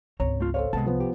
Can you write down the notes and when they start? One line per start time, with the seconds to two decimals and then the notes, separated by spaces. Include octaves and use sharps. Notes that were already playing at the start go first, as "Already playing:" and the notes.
0.20 G#1 C#2 C#5 A#5
0.40 A3 F4
0.54 A4 C5 C#5 F5
0.73 C2 G#3 B3 A5
0.86 C3 F3 B3
1.00 G4